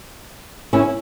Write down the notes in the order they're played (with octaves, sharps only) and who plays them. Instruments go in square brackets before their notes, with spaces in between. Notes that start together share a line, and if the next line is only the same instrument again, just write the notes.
[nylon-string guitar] C#4 E4